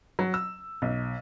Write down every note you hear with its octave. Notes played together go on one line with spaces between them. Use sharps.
F#3
E6
B1